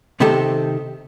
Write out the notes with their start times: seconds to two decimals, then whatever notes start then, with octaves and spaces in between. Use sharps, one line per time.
0.20 C3 D#3 C4 G4 A4